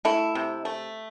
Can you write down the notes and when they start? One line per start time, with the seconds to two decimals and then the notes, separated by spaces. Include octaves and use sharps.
0.05 A3 E4
0.35 C3
0.65 A3